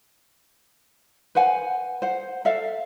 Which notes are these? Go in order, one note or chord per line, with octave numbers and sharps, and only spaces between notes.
B4 C5 F#5 G#5
C5 F#5
A4 E5 F5